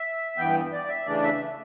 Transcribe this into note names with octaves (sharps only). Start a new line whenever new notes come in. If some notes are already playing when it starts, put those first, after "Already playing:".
Already playing: E5
G2 E3 B3 G5
D5
E5
C#3 E3 A3 D4 D5
E5